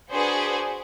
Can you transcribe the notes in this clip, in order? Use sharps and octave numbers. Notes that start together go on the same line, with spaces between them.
D4 F#4 G#4 B4 C5 G#5